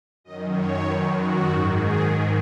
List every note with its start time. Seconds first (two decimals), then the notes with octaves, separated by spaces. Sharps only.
0.24 F#2 D#3 D#5
0.53 C#5
0.83 F#2 D#3 B4
1.13 F#4
1.42 G#2 D#3 F#4
1.71 G#4
2.00 G#2 D#3